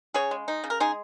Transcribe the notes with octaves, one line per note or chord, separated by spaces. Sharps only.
C#3 G#4 C#5
G#3
D#4
C#3
A#4
G#3 D#4 G#4